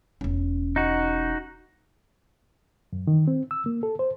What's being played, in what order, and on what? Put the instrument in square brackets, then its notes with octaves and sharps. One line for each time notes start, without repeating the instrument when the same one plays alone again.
[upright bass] E1 C#4
[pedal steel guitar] D#4 F#4
[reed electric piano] F#2
D#3
C4
E6
A#3
A4
C5